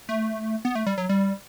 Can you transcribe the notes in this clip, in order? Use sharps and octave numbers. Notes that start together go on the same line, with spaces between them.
A3
B3
A3
G3
F#3
G3